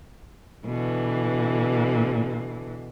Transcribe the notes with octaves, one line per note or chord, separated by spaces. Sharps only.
B2 D3 E3